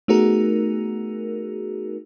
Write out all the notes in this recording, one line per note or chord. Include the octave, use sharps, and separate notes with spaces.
A3 B3 D#4 F#4 G#4 A#4